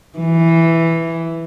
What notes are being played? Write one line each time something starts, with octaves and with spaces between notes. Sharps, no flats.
E3